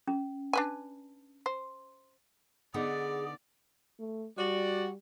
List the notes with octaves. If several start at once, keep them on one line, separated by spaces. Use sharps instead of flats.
C#4
D4 B4 G#5
C5
D3 B3 D#4 G#4 D5
A3
G3 F#4 D5